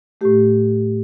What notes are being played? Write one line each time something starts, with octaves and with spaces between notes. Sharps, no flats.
A2 A3 G4